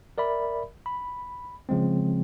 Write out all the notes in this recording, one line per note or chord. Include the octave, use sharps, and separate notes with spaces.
A#4 D5 E5 B5
B5
C#3 F3 G#3 C4